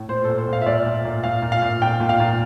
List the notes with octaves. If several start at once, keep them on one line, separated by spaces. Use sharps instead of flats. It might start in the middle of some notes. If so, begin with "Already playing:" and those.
Already playing: A2
A#2 C5
A#2 A4
C5
A#2
F5
E5
A#2 D5
A#2
A#2
A#2 F5
A#2
F5
A#2
A#2 G5
A#2
F5
A#2